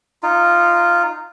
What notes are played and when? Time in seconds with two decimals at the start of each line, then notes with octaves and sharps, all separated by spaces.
0.23 D#4 F4